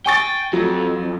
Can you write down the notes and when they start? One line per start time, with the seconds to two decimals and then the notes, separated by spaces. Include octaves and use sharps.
0.06 G5 G#5 C#6 A6
0.53 F2 F#3